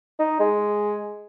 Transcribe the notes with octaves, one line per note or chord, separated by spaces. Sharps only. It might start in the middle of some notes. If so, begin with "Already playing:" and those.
D#4
G#3